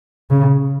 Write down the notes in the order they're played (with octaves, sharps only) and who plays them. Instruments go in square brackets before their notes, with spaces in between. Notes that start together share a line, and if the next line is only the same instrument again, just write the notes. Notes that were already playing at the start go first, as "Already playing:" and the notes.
[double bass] C#3